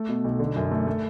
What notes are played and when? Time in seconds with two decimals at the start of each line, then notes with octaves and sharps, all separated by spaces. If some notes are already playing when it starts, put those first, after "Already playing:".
Already playing: A3
0.09 B2
0.24 B1
0.39 D3
0.56 F#2
0.71 A3
0.87 A3